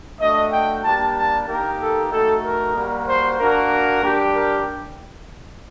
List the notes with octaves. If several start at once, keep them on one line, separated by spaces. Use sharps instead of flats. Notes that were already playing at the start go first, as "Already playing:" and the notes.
A3 D4 F#4 D#5
G5
G3 A#3 D4 G4 A5
A5
A#3 D#4 G4 A#4
A4
A3 D#4 F#4 A4
A#4
G3 A#3 F#4
C5
A#3 D4 F#4 A#4
G3 D4 G4
A#4